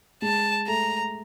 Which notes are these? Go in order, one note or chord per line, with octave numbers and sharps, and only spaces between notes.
G#3 A5
A3 A#5